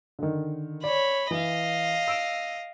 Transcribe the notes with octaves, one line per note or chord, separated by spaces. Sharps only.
D3 D#3
C#5 D5 B5
E3 D#5 F5
E6 D7 E7